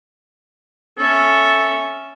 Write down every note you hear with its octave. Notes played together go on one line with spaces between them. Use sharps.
C#4 A4 E5